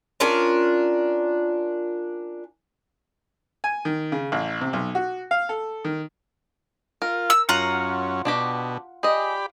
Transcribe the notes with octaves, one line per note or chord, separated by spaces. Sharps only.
C#4 D4 F4 A#4
G#5
D#3
C#3
A1
C3
B1
F#4
F5
A4
D#3
F4 A#4
E6
F#2 C#4 F4 F#5 A#5
B2 D4 F#4 G4
G4 G#4 D5 D#5 B5